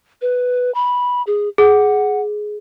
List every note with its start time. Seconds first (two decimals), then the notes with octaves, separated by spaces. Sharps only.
0.21 B4
0.74 B5
1.27 G#4
1.58 G#4 F#5